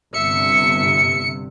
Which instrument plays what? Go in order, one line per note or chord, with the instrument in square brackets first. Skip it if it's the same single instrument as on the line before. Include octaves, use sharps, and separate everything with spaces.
[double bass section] G1 G2 C3 [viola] E5 [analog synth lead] C#7